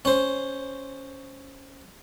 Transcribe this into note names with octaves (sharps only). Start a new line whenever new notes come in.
C#4 C5